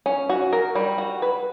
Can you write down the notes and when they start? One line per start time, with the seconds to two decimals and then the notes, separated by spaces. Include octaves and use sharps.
0.06 C#4
0.29 F#4
0.53 A#4
0.75 G3
0.98 F#4
1.22 B4